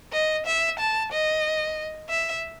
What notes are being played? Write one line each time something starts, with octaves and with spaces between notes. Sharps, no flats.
D#5
E5
A5
D#5
E5